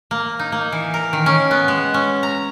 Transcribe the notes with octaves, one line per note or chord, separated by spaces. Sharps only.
A#3
D#4
A#3
E3
A#4
D#3
C#4
B3
G#3
C#4
A#5